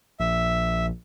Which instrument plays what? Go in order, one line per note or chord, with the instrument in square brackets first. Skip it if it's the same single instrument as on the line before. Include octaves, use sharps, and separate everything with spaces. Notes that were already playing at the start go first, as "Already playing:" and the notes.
[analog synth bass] A#1 [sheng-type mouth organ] E5